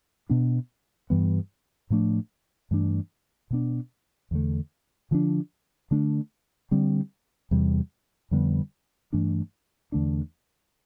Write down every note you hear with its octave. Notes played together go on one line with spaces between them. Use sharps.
B2 B3 D4
G2 E3 G3 B3
A2 F3 A3 D4
G2 E3 A3 D4
B2 B3 D4
E2 D3 A3
D3 F3 A3 D4
D3 A3 D4
D3 G3 C4
E2 C3 G3
F2 D3 G3 B3
G2 E3 A3 D4
E2 D3 A3 D4